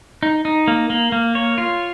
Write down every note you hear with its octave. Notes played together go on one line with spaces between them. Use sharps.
D#4
D#4
A#3
A#3
A#3
C#5
F4